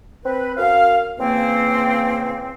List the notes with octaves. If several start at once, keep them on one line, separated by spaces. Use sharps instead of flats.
C4 B4
F#2 F5
C#3 E3 A#3 C4